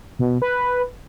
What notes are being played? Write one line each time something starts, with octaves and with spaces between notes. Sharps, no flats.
B2
B4